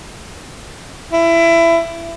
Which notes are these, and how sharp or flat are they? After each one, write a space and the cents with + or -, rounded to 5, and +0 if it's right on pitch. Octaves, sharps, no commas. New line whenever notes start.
E4 +20